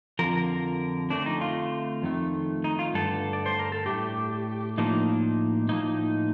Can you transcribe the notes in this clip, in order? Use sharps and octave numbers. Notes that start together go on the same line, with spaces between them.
F2 D3 F3 A#4
D3 A3 C4 D4
D#4
F4
F2 D#3 A3
D#4
F4
G2 D3 A3 D4 A4
D5
C5
A#4
A4
A2 A3 D4 G4
A2 F3 A#3 D4 D#4
A2 F3 A#3 D#4